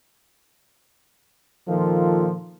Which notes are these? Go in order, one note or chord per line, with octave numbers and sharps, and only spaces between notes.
A#2 D#3 F3 A#3 F4 A4